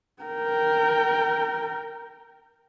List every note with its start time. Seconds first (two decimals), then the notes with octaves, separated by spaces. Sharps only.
0.23 A#4 G5